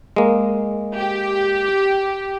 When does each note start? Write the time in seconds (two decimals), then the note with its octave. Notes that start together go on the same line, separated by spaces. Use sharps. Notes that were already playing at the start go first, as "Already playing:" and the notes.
0.16 G#3 A#3
0.95 G4